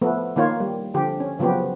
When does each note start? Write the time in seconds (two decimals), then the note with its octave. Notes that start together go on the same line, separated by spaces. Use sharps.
0.01 F3 A3 B3
0.36 D#3 A#3 F4 C#5
0.60 G3
0.94 D3 F3 G4
1.20 C#4
1.39 C#3 F3 F#3 B3 G4